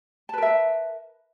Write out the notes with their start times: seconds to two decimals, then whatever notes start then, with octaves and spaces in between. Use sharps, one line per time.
0.29 A5
0.33 B4
0.38 A#4
0.42 E5